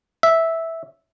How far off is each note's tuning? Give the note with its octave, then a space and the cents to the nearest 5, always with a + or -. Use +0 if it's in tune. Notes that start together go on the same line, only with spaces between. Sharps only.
E5 -5